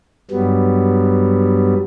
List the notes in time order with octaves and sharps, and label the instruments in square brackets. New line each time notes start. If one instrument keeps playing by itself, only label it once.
[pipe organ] G2 F#3 G3 B3